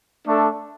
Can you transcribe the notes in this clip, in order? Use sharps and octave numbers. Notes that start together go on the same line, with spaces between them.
A3 D4 A4